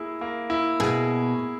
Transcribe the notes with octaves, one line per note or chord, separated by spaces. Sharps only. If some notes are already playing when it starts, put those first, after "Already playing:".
Already playing: A#3 E4 G#4
A#3
E4
B2 G#4